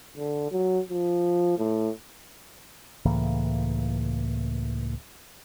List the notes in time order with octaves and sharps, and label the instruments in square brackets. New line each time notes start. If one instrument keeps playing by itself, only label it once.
[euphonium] D3
F#3
F3
A2
[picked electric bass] C#2 A2 E3 A#3